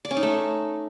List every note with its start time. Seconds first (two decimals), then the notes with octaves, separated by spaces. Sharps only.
0.05 D5
0.11 C#4
0.17 D#4
0.23 A3